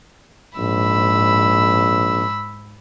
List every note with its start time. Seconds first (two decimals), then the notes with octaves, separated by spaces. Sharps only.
0.58 A#1 G#2 B5 E6